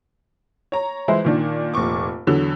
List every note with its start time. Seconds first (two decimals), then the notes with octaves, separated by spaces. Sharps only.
0.72 C#5 A#5
1.08 E3 G#3 E4 C5
1.24 A#2 D#3 D4
1.74 F1 A#2 C#6 D6
2.27 E2 D3 F#3